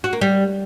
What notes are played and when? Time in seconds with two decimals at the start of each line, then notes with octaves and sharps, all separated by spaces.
0.04 F#4
0.13 A#3
0.21 G3